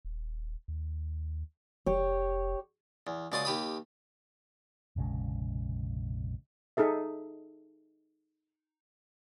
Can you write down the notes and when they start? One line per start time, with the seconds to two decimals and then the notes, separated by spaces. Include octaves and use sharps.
0.05 D#1
0.68 D#2
1.86 F1 G4 C#5
3.07 E2
3.32 C#2 B2 D5 C6 D6 D#6
3.45 D#2 G4 B5 D#6
4.96 F1 A#1 C#3 G#3
6.77 D#4 G#4 A4 E5